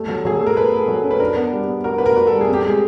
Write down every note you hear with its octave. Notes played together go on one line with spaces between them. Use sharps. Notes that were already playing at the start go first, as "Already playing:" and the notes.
Already playing: G3 A3
F#3
F#3 G#4
A3 A4
A#4
A3 B4
A3
F#3
C#4
B4
D4 A#4
B3
G3
B3
F#4 A#4
F#4 B4
A#4
F#4
A4
G3
G#4
C4
G4
G#3 G#4